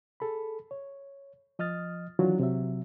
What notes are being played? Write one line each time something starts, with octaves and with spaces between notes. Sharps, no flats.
G#4 A4 B5
C#5
F3 D#5 D#6 F6 A6
D#3 E3 F#3 D4 F4 F#4
C3 F#3 E5